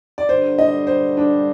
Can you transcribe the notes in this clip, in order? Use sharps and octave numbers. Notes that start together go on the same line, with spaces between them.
D5
G2 D3 G3 C5
D#5
C5
D4